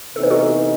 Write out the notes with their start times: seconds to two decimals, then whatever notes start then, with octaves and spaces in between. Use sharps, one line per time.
0.15 C3 E3 B3 D#4 A4
0.23 B4
0.30 F#4 A4